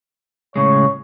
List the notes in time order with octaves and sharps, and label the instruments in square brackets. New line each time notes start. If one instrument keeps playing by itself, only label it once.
[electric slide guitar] A2 C#3 G#3 [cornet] C#5